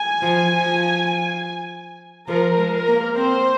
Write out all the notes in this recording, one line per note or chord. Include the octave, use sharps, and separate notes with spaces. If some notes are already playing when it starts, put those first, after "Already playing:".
Already playing: G#5
F3
F3
F3 A#4
G#3
A#4
A#3
C4 C5